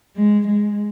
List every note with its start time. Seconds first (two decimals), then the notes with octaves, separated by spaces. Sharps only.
0.16 G#3
0.47 G#3